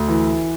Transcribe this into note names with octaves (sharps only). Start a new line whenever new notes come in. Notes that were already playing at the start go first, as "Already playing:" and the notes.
Already playing: D2
E3